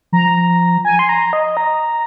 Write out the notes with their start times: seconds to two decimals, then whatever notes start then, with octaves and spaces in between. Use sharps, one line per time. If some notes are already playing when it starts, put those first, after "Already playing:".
0.12 F3 A#5
0.85 G#5
0.99 C6
1.09 A#5
1.33 D#5
1.57 A#5